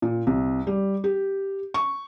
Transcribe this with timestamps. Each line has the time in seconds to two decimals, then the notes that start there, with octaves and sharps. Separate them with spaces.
0.02 A#2
0.27 C2
0.67 G3
1.04 G4
1.74 C#6